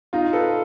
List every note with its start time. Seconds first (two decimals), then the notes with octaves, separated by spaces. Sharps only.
0.13 D#4 F4
0.33 A4 B4